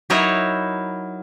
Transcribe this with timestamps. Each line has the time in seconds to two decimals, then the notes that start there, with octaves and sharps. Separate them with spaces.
0.10 F#3 D#4 E4 A#4 B4 C#5